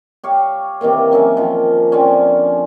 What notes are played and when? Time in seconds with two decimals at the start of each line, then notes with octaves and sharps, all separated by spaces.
0.24 G4 C#5 F5
0.81 C3 D#3 E3 A#3
1.11 F#3 C#4 A#4 E5
1.37 D#3 F3
1.92 D3 F3 C4 C#4